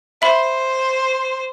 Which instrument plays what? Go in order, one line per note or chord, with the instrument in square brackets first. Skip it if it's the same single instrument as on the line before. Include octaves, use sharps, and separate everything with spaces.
[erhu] C5 [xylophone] E5 B5